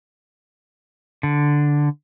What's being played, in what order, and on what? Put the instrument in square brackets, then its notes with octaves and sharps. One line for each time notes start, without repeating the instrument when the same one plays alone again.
[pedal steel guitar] D3